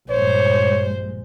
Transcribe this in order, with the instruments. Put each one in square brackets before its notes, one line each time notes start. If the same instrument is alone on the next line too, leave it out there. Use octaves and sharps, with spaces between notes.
[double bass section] A#1 G2 G#3 [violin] C5 [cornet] C#5